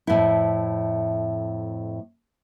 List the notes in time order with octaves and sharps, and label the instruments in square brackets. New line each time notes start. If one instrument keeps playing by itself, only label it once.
[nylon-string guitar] F2 A2 E4